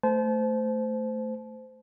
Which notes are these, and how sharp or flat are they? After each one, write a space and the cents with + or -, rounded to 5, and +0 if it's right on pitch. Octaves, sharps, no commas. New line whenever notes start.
A3 +5 C5 -20 A5 -35